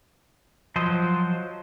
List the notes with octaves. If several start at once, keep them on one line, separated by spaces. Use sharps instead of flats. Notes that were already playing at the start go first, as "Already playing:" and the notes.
F3 F#3 C5 D#5